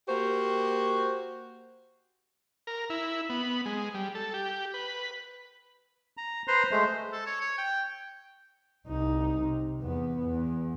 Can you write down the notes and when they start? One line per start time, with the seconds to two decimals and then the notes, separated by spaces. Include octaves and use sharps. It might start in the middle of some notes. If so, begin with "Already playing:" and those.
0.07 A#3 F#4 G4 C5
2.67 A#4
2.90 E4
3.29 B3
3.66 G#3
3.94 G3
4.15 A4
4.34 G4
4.74 B4
6.17 A#5
6.48 B4 C5 A#5 C6
6.71 G#3 A3 C5
7.12 A4
7.26 C#5
7.41 C#5
7.58 G5
8.87 C2 D#4
9.41 C3
9.81 E2 B3
10.27 E2